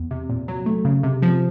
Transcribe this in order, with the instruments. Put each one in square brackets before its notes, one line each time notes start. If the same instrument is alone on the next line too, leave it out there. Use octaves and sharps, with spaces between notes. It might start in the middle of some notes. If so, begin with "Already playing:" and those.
Already playing: [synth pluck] E2
C3
A#2
F#3
A3
C#3
C3
F3